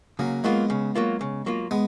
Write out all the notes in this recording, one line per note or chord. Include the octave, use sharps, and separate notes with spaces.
C#3 F#3 A#3
F#3 G#3 A#3 B3 F4
C#3
F#3 A#3 F4
C#3
F#3 A#3 F4
G#3 B3